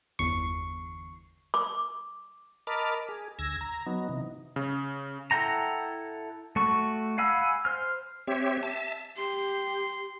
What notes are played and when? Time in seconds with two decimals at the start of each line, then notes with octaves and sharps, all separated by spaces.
0.19 G1 E2 C#6 C7
1.54 D6
2.67 A#4 D#5 A5 B5 D6 F6
3.09 G#4
3.39 D2 E6 G#6 A#6
3.61 A#5
3.86 F#3 B3 D#4
4.09 C3 E3 D#4
4.56 C#3
5.31 E4 A4 F#5 G5 A#5
6.56 A3 F#4 C#6
7.18 F5 F#5 G#5 B5 E6
7.65 C5 F6
8.27 C4 G4 C#5 E5
8.63 E5 A5
9.17 G4 C6